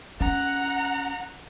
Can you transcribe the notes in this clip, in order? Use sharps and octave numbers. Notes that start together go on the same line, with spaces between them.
C#4 F#5 A#5